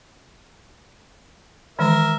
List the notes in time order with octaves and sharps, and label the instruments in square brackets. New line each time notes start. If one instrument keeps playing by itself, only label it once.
[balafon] D#3 E3 G#3 [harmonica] A#4 E5